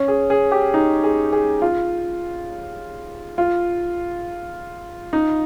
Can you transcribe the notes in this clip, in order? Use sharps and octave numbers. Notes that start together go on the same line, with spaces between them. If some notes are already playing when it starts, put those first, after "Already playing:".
Already playing: C#4
G#4
G#4
G4
D#4
G#4
G#4
F4
F4
D#4